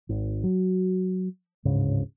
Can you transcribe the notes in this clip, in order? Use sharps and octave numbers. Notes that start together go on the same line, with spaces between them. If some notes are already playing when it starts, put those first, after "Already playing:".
G#1
F#3
D1 G#2 C#3